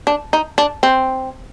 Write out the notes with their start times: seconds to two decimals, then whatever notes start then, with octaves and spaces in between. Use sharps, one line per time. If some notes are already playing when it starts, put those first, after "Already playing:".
0.07 D4
0.33 D#4
0.58 D4
0.83 C4